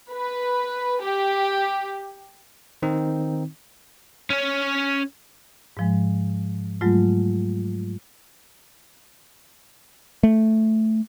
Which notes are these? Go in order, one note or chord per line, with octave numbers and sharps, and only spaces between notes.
B4
G4
D#3 C4 D#4
C#4 C#5
G#2 F3 G#3
G#2 F#3 G#3 A3 F4
A3